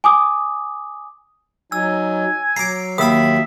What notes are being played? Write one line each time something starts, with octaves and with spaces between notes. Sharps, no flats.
G#5 D6 D#6
F#3 D#4 G#5 E6
F#3 A#5 D6 C7
D#2 E5 B5 D#6 E6